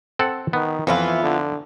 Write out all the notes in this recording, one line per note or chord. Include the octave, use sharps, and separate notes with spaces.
C4 A4 F#5
D#3 B3
F2 E3 B3 E4 F4
D3